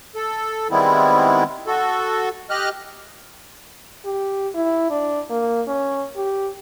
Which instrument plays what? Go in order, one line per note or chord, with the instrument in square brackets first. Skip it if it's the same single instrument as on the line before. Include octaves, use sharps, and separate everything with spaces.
[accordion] A4
D#3 G3 G#3 B3 C4 E4
F#4 A4
G4 D#5 F6 F#6
[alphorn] G4
E4
D4
A#3
C#4
G4